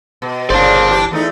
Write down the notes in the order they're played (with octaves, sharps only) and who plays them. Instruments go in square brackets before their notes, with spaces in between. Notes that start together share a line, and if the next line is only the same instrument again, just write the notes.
[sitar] B2
[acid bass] G1 [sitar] A#2 C#3 [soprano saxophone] C5 [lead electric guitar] D5 A5
[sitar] E3 G4
E2 A3 D#4